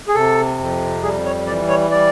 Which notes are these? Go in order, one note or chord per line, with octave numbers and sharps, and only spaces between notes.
G#4
C3 A4
F2
G3 G#4
C#5
E3 D5
C#5
G3 D5